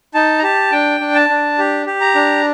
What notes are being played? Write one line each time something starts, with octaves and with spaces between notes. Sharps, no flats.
D#4 A5
A#5
G4 A5
D4 G5
D4
A5
D4
G4
G4
A#5
D4